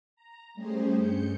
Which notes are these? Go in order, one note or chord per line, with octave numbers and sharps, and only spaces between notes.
A#5
G3 A3 C#4 G4 G#4 C5
G2 G6 C#7